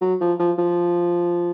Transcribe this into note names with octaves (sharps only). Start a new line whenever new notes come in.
F#3
F3
F3
F3